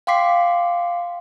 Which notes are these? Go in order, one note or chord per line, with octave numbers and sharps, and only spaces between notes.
F5 G5 C6 D6 B6 C7